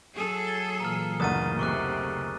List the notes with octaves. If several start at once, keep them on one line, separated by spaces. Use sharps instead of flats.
F#3 G#4 A4
G#6 A6 G7
A#2 E3 A#3 A#5 F6
F#1 D2 A3 F#5 D#6 A6 D#7
C3 A3 C#6 D6 F#6
C#3